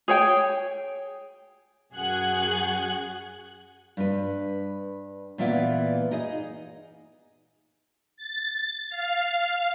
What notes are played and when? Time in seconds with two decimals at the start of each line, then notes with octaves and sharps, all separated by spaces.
0.08 G#4 C#5 G5
1.94 F#2 F#4 G#4 F#5 F#6 G#6
3.97 G2 B4
5.38 A#2 E3 B3 F4 D5
6.11 D#4 G#4 D#5
8.17 A6
8.90 F5